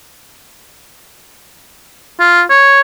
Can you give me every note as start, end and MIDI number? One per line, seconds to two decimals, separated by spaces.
2.20 2.42 65
2.50 2.81 73